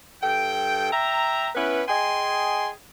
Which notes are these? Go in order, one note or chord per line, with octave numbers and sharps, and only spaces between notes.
G2 A4 G5
E5 G5 A#5
B3 C#4 E4 B4
G#4 D#5 G5 G#5 C6